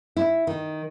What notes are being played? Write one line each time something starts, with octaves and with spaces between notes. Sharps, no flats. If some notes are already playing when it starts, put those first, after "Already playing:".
E4
D#3